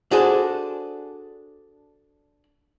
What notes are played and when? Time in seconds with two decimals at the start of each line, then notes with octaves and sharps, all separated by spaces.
0.11 D4 F#4 G#4 A4 C5